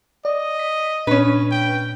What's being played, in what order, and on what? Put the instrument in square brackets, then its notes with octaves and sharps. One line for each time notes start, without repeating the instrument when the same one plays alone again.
[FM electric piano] D5 [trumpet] D#5
[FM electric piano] B6
[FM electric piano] A#2 D4 [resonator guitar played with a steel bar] C#4 B4
[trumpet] G5